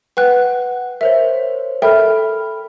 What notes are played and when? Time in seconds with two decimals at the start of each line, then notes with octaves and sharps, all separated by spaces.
0.17 B4 F#5 G5 F#6
1.01 A#4 C5 C#5 E5
1.82 A4 A#4 E5 G5 B5 F6